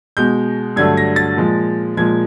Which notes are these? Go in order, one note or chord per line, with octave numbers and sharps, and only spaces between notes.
B2 G#3 G6
G2 D3 F#3 A3 G#6
A#6
A6
A#2 F3 G#3
A#2 F3 G#3 G#6